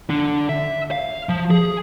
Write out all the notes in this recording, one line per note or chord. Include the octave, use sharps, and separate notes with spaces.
D3 D4
E5
F5
F3
G#4